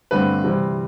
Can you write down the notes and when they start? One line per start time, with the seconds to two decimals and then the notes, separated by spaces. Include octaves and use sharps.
0.11 G2 D3 A3 C4 B4
0.44 C3 E3 G3 C4